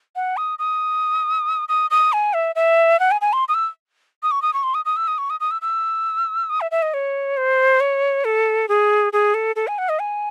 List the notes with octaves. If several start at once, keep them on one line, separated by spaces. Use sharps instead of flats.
F#5
D#6
D#6
D#6
D#6
G#5
E5
E5
F#5
G#5
G#5
C6
D#6
E6
D#6
C#6
D#6
C#6
C6
D#6
D#6
E6
D#6
C#6
D#6
D#6
E6
E6
D#6
E5
E5
D#5
C#5
C5
C#5
A4
G#4
G#4
A4
A4
G#5
F#5
D#5
G#5